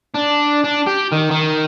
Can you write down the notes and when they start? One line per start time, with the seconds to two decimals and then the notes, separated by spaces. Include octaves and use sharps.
0.14 D4
0.64 D4
0.87 G4
1.12 D#3
1.31 D#3